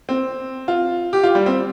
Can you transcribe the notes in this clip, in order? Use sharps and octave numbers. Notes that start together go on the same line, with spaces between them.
C4
F4
G4
F4
G3
C4